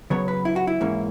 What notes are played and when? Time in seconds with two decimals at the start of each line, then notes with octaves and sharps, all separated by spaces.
0.10 C#3 F#3 B3 C#5
0.28 B4
0.45 E4
0.56 F#4
0.67 E4
0.81 G#2 E3 A#3 C#4